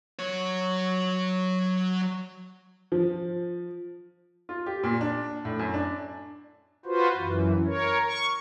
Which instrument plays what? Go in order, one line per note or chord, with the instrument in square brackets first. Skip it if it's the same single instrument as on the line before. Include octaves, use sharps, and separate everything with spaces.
[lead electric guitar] F#3 C#5
[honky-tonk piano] F3
[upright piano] F4
G4
A#2
D4
A2
F#2
D4
[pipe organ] F4 F#4 B4 C5
F#2 E3
A#4 C#5
C#6